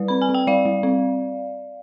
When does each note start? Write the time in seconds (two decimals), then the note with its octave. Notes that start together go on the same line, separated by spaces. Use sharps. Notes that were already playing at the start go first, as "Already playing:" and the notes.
Already playing: G3 B4 D5
0.08 C4 B5
0.22 G#5
0.29 C4
0.34 G5
0.47 G3 D5 F5
0.65 G3
0.83 C4